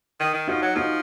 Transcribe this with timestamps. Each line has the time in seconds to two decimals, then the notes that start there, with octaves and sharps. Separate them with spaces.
0.20 D#3
0.34 D#3
0.48 F3 D#4 F#4
0.62 F#3
0.75 F3 D#4 F#4